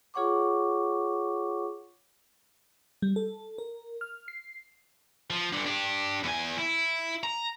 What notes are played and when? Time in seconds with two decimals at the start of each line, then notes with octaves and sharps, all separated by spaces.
0.14 F4 G#4 C#5 F#5 C#6 D6
3.02 G3
3.16 A4
3.58 A#4
4.01 F6
4.28 C7
5.30 F3
5.52 G2 D3
5.66 D4 G4
6.23 E2 G#5
6.58 E4
7.24 A#5